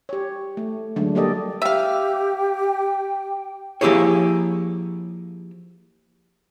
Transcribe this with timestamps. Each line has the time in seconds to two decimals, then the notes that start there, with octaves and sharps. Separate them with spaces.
0.09 G4 C#5
0.57 A3
0.96 D3 F#3 G#3 A3 D4
1.15 G3 A#3 G4 A4 D5 D#5
1.62 G4 E5 F5 G5
3.81 F3 A#3 E4 G4 G#4 C#5